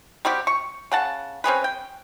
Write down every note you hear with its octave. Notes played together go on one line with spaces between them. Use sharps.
G3 C4 F#4 G4
C#6
C#3 F#5 A5
C4 C#4 G#4 B4
G5